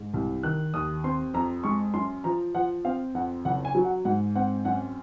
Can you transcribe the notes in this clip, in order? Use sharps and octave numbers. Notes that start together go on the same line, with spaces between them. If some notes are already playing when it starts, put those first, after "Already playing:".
Already playing: G#2
C2
D#3 F#6
D#2 D#6
C4 C6
F2 A#5
G#3 C#6
F#2 C6
F3 A#5
F3 F#5
C4 F5
F2 F#5
F#1 F#5
G#5
F#3
F#5
G#2 F#5
C4 F#5
F#2 F#5